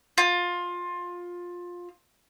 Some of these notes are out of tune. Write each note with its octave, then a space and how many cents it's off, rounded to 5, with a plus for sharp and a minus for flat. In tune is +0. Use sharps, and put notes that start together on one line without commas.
F4 +15